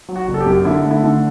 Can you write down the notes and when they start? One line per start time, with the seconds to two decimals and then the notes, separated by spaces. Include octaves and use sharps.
0.09 F#3
0.16 F#4
0.28 F#1
0.34 A4
0.41 G4
0.46 F#2
0.65 D3 E4
0.85 A3
0.91 E4
1.04 D3